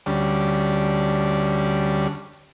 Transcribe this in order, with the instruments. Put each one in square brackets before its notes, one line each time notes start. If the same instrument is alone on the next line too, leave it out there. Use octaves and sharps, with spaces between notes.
[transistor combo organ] D2 G3 C#4 D4